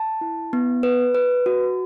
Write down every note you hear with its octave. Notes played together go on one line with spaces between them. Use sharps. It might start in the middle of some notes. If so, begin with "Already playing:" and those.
Already playing: A5
E4
B3
B4
B4
F#4